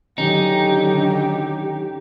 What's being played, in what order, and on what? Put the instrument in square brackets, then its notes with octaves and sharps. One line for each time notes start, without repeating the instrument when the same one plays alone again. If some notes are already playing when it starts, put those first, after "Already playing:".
[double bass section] D3 F#3 [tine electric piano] D#3 C#4 [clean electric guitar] D#4 [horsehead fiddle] G4